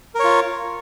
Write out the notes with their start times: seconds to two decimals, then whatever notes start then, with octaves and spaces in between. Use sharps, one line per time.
0.15 A#4
0.19 C#5
0.24 F4